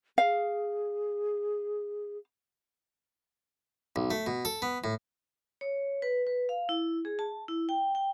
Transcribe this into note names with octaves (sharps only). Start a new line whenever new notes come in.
G#4 F5
B1
A3
B2
A4
B3
A2
C#5
B4
B4
F5
E4
G#4
A5
E4
G5
G5